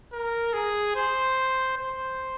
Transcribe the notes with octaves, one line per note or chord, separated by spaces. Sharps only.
A#4
G#4
C5
C5